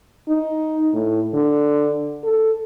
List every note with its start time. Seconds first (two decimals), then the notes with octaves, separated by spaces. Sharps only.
0.28 D#4
0.93 A2
1.34 D3
2.24 A4